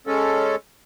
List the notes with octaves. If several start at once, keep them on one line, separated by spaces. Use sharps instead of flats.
G#3 C#4 A4